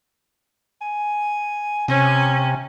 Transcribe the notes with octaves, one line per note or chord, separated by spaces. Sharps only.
G#5
C3 C#4 G#5